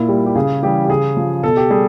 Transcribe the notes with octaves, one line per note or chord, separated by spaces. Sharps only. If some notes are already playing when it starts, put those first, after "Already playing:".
Already playing: A#2 E4
G3
G4
C#3 G#4
E3 G3 G4
G4
C#3 G#4
F3
B2 A4
G4
G3 G#4